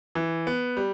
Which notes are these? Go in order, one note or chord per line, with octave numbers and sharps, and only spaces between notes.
E3
B3
G3